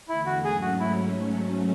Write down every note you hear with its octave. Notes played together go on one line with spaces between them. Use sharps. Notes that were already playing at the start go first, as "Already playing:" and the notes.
E2 D3 A3 E4
F#4
G#2 F#3 A3 C#4 G#4
F#4
E4